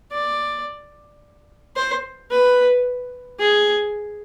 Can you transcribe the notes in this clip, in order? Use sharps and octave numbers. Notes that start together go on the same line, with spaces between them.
D5
C5
B4
G#4